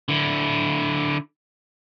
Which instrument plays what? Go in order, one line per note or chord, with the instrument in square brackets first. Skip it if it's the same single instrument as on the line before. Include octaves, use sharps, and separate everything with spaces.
[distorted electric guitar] D3 E4